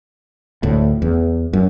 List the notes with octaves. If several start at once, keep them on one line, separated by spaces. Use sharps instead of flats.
D2 A2
E2
F#2